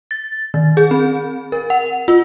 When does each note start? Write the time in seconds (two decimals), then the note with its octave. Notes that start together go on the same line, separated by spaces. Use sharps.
0.11 A6
0.54 D#3
0.77 G#4
0.91 C4
1.52 A#4
1.70 F#5
2.08 F4